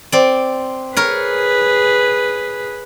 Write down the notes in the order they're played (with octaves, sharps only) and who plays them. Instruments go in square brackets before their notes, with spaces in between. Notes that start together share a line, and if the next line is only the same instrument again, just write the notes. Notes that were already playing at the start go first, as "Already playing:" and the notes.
[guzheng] C4 D5
[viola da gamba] G#4 B4 [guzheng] A#4 C#5